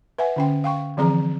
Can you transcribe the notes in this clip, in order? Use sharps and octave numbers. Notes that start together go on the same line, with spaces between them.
B4 E5 F#5 G#5
D3 C#4 G5
F5 G5 C#6
D3 E3 F3 C4 G#4 A#5